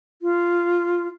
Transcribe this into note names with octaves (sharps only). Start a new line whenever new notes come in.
F4